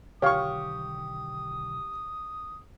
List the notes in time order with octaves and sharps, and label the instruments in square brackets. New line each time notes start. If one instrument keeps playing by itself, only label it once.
[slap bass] B1 D3 D#3 [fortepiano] G4 C#6 [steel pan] C#5 F5 [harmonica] D#6